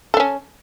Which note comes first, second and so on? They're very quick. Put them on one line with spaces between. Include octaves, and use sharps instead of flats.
A4 D4 C#4